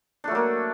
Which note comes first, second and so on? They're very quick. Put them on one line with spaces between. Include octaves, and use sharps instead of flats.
D4 A3 F#3 A#3